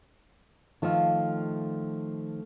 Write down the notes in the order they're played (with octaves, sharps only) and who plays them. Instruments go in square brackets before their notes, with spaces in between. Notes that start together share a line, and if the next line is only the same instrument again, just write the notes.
[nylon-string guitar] D#3 F3 [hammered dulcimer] A3 F5